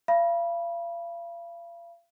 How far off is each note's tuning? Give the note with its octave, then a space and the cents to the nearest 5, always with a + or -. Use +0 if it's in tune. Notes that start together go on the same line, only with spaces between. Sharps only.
F5 -40 B5 -25